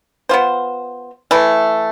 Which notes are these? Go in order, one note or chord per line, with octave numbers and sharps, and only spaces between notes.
B3 F4 C5
E3 A3 E4